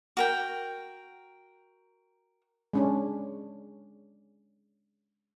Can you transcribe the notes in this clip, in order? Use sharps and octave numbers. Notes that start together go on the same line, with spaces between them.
F#4 A#4 G5
G#3 C#4 D4